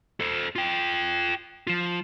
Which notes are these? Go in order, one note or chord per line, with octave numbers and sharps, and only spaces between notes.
A4 C5
F4 G5
F3 F4